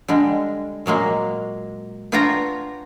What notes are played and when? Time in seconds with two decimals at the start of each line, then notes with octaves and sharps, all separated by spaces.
0.08 D3 G3 G#3
0.86 A#2 F#3 G#3 A#3
2.12 B3 D4 F4 C#5 G5 A#5